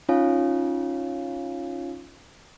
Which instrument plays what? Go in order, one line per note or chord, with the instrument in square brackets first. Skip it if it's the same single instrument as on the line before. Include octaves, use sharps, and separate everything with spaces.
[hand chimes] C#4 D#4 F4 C#5 F5 G#5